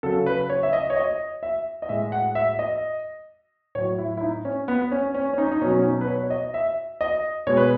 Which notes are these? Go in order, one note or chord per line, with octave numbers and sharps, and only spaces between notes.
C#3 F#3 A4
B4
C#5
E5
D#5
C#5
D#5
E5
D#5
A2 G#3 E5
F#5
E5
D#5
A2 F#3 C#5
E4
E4
D#4
C#4
B3
C#4
C#4
C#4
D#4
D#4
B2 F#3 C#4
C#4
D#4
B4
C#5
C#5
D#5
E5
D#5
B2 G#3 C#5
B4